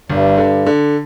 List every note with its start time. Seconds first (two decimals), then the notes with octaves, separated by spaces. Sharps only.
0.09 G1 G2
0.37 D3
0.66 D3